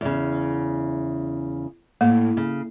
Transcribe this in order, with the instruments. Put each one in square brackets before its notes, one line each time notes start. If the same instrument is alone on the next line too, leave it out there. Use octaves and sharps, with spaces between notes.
[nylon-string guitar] E2 C#3
[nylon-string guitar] A2 [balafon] A#3
[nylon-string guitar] C#3